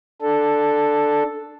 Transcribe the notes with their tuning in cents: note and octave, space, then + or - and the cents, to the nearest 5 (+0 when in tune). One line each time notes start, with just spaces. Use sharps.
D4 +10 A4 +0